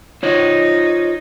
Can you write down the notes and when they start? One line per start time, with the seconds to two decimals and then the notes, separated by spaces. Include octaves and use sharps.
0.23 D#4 F4 C5 C#5